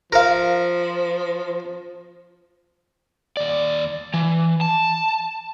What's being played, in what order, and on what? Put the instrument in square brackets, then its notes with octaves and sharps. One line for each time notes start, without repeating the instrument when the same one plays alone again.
[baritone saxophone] F3 [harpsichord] A#4 F5
[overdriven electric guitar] D#2 D5
E3
A5